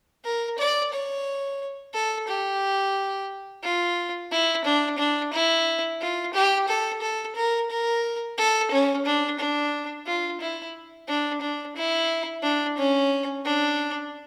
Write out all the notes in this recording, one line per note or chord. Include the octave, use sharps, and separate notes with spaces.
A#4
D5
C#5
A4
G4
F4
E4
D4
D4
E4
F4
G4
A4
A4
A#4
A#4
A4
C#4
D4
D4
F4
E4
D4
D4
E4
D4
C#4
D4